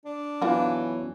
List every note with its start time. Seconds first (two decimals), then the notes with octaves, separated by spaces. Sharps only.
0.05 D4
0.41 E3 F#3 B3 C#4 F4 F#4